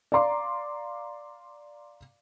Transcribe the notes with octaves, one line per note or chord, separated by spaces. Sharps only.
D5 F5 A#5 C6 D6